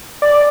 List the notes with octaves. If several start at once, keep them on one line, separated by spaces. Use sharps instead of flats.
D5